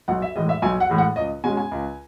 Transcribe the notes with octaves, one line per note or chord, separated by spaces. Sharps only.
B1 F#5
E5
A2 E3 G#3 D#5
E5
B1 G#5
F#5
A2 E3 G#3
F#5
C#2 D#5
B2 G#3 C#4 G#5
G#5
C#2